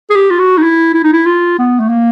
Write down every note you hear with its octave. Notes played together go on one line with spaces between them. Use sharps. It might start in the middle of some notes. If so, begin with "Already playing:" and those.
G#4
G4
F4
F#4
D#4
E4
E4
D#4
E4
F4
B3
A3
A#3